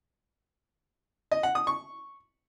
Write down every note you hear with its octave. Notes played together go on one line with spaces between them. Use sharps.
D#5
F#5
D#6
C#6